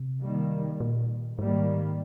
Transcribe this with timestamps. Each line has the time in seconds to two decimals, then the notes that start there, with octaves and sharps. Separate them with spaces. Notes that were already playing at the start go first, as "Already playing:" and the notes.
Already playing: C3
0.22 D#3 G3 A#3
0.80 A#2
1.39 G#2 D#3 G3 A#3